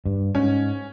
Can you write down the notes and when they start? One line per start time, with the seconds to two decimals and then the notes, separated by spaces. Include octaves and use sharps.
0.06 G2
0.35 G#2 C#4